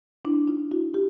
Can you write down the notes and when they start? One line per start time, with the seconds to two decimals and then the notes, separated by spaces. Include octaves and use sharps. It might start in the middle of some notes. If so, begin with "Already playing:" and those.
0.25 D4 E4
0.48 D#4 F4
0.71 E4 F#4
0.94 F4 G4